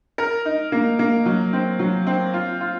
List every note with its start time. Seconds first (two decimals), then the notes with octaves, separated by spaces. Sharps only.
0.18 A#4
0.45 D#4
0.72 A#3
0.99 A#3
1.26 F#3
1.53 C4
1.79 F#3
2.07 C4
2.34 F4
2.61 F4